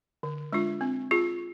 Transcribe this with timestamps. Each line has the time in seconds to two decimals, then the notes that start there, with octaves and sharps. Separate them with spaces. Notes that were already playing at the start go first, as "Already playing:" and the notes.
0.23 D3
0.53 G#3 D4 F4
0.81 C4
1.11 F4 G#4